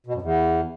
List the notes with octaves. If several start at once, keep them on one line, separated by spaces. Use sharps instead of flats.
B2
F#2
E2